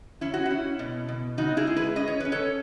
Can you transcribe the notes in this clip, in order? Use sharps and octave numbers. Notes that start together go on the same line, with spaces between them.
C#4 E4
F#4
C#4 E4
B2
B2
C#3 D#4 F#4
E4 G#4
G#3
G#4 B4
C#4 D#5
C#5
C#4 B4
A4 C#5